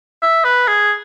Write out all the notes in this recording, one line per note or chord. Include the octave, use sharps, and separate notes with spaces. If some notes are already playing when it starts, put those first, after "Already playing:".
E5
B4
G#4